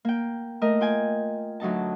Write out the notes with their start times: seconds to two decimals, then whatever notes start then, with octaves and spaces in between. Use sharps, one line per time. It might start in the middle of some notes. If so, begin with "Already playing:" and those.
0.05 A#3 G5
0.61 A3 A#4 D#5
0.81 F4 G5 G#5
1.60 D2 F#3 D#4 A5